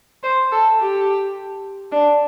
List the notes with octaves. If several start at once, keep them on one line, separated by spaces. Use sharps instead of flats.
C5
A4
G4
D4